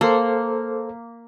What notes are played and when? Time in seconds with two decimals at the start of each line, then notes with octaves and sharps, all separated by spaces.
0.01 A#3 A4 C5